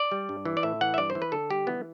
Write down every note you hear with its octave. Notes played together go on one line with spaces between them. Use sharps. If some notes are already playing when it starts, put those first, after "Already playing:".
Already playing: D5
G3
G2
E3
D5
A2 E5
E3 F#5
E5
G2 D5
C5
E3
B4
D3 A4
G3 G4
E3 B3